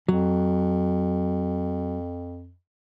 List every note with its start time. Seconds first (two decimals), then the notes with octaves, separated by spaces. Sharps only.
0.09 F2 F#3